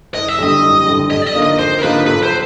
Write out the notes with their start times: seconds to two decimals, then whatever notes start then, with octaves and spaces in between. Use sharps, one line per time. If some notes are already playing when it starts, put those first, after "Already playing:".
0.14 F#1 D#5
0.28 E5
0.38 F2 D3 G3 D#5
0.62 F#1
0.86 F2 D3 G3
1.10 F2 D#5
1.22 D5
1.27 D#5
1.34 D3 F3 A#3 D#4
1.43 D#5
1.59 F2 C5
1.79 A#4
1.83 D3 F3 A#3 D#4 B4
2.07 B1 B4
2.23 C5